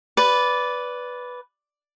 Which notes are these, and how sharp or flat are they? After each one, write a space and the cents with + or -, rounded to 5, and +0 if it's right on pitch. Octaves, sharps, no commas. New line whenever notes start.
B4 +0 D5 -15